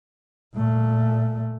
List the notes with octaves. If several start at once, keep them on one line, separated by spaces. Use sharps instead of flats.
A#2 A3